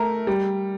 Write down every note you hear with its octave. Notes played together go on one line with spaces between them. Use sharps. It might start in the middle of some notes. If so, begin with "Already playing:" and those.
Already playing: A3 A#4
G3